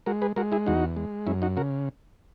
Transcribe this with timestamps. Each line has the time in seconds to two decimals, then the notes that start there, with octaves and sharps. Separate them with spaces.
0.06 G#3 F#4 A#4
0.22 G#4 B4
0.36 G#3 F#4 A#4
0.52 E4 G#4
0.66 E2 D#4 F#4
0.97 G#3
1.27 F#2 C#4 E4
1.42 D#4 F#4
1.57 C#3 F#4 A#4